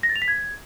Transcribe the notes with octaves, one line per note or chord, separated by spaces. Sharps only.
A#6
A6
F7
B6
G#6